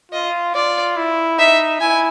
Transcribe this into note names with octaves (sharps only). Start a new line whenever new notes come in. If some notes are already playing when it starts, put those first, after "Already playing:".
F4 D#5
F4 D5
E4
D#4 E5
E4 G#5